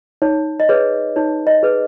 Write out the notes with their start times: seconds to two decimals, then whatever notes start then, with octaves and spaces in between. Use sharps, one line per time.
0.22 D#4 C#5
0.60 D#5
0.69 G#4 B4 C#5
1.16 D#4 C#5
1.47 D#5
1.63 G#4 B4